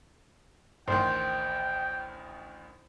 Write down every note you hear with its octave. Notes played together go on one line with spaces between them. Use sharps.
A1 D2 D#3 C5 G5